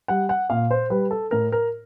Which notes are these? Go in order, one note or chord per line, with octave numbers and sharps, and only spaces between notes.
G3 F#5
F#5
A#2 F5
C5
G3 B4
A4
A2 A#4
A#4